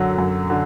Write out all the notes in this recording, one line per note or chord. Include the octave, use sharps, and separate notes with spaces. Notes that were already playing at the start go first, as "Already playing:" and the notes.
Already playing: F#2 D3 F#3
F#2
D3